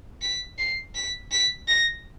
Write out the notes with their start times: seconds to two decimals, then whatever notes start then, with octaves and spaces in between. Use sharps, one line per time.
0.22 B6
0.59 C7
0.95 B6
1.32 B6
1.68 A#6